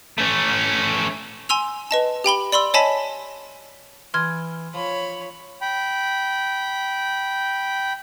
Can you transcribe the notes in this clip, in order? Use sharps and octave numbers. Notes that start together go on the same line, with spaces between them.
A3 C#4
G#5 C6 E6 F7
B4 D#5 A5
G4 G5 B5 G7
D5 B5 C6 E6
C#5 D#5 G#5 A5 B5 B6
E3 C6 F6 G#6
F3 C#5 B5
G5 B5